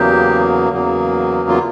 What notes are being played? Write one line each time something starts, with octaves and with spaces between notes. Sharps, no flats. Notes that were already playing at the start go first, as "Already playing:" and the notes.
Already playing: E2 C#3 F#3 A#3 G4
E2 C#3 F#3 A#3
F4